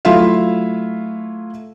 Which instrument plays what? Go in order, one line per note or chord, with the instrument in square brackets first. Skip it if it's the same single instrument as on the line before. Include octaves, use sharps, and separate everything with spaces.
[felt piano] F#3 A3 E4 F4 E5 F5